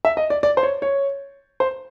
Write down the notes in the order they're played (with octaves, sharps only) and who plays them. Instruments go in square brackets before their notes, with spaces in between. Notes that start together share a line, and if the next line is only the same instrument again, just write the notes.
[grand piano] E5
D#5
D5
D5
C5
C#5
C#5
C5